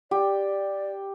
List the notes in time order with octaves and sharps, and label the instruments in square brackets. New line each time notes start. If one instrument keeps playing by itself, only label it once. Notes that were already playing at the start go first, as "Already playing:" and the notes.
[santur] G4 [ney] D5